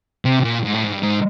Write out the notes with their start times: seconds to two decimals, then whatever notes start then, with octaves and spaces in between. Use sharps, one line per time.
0.25 C3
0.44 A#2
0.64 G#2
0.74 A2
0.83 G#2
0.92 G2
1.03 G#2